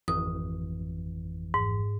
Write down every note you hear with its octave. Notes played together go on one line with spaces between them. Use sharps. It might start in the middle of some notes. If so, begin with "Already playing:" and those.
G#1 F2 E3 D#6
G#2